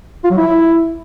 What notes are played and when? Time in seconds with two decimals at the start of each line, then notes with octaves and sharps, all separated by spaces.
0.24 F4
0.31 F#3
0.37 E4